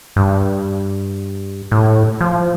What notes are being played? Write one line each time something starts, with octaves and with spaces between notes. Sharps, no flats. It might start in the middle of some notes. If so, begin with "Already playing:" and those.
G2
A2
F3